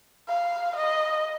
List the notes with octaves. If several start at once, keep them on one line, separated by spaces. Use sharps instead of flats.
F5
D#5